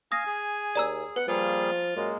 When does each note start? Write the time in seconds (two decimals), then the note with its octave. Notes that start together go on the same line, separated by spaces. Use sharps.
0.12 F5 G#5 D#6 A#6
0.26 G#4
0.75 D#2 D5 A#5 E6
1.16 B3 B4 F#5
1.28 F3 G3 A#3 F4 G#4
1.96 F#2 G#3 A#3